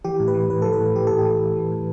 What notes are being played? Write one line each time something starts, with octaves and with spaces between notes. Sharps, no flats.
E3 G4
A2
B4
E3
A2 B4
E3 A4
B4
A2
E3 G4
A2 A4
G4
E3
A2
E3
A2